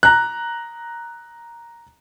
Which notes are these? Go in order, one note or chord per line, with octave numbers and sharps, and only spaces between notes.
A#5 F#6